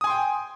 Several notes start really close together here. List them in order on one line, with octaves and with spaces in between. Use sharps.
D#6 G#5 C6 G5